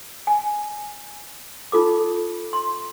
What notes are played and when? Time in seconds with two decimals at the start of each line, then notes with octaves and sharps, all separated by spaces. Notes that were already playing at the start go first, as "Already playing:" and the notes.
0.27 G#5
1.72 D#4 F4 A4 D6
2.53 C6